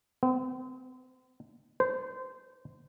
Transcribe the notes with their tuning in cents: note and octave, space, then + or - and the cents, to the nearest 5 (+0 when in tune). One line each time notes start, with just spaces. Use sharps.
C4 -40
C5 -20